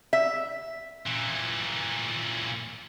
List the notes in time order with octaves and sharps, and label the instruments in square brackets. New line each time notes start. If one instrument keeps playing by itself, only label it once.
[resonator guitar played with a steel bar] E5
[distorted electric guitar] A#2 E3